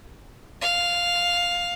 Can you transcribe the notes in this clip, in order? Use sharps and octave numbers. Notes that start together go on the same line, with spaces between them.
F5